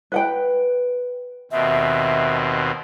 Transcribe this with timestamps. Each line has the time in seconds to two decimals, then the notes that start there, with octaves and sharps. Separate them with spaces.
0.12 B4 F#5 G5
1.51 D#2 B2 C4 E5